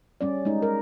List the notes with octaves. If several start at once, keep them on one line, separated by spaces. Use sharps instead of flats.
G3 C#4 D5
G#3 D#4
A#4